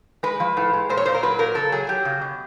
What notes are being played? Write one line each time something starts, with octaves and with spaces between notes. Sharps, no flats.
G#3 B4
F3
A2
G#3
A#2 C5
C#5
A#2 C5
A#4
F#3 B4
A#2 A#4
C#3 A4
F#3 G#4
F#3 G4
C#3
B2